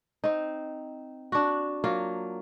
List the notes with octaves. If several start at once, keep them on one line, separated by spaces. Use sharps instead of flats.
C4 D#4
D4 F#4
F#3 A#3 F4